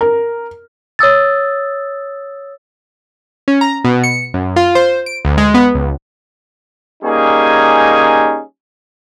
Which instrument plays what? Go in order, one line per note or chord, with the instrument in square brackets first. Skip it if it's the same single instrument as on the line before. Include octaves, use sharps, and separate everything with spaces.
[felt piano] A#4
[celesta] C#5 D#6 E6 A6
[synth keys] C#4
A#5
B2
C#7
F#2
F4
C5
D7
D2
G#3
B3
C#2
[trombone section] G3 A#3 C#4 D#4 G#4